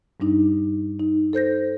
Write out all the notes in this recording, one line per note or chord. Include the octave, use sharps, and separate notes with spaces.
G2 G3 D4 D#4
D#4
A4 C5 G6 A#6